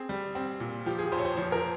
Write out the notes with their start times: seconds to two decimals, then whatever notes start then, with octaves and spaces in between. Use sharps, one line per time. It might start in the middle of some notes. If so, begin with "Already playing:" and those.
Already playing: C4 G#4
0.09 G3
0.35 C4
0.60 A#2
0.86 F3 G4
0.99 G#4
1.12 F2 C5
1.19 C#5
1.25 C5
1.37 F3 C#5
1.52 A#4